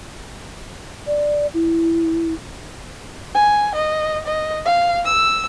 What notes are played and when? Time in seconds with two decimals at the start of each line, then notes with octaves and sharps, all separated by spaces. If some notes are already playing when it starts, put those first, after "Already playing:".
1.07 D5
1.54 E4
3.34 G#5
3.75 D#5
4.26 D#5
4.65 F5
5.05 E6